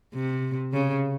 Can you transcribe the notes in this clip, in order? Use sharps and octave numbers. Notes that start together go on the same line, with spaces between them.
C3
C#3